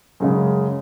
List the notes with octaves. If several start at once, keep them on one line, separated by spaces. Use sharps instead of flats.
F#2 C#3 G#3